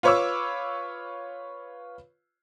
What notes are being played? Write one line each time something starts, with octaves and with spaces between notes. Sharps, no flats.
F4 B4 C#5 C#6 D6 E6